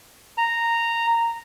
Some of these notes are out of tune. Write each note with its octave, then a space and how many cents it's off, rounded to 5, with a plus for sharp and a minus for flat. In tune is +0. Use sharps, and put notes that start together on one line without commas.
A#5 -10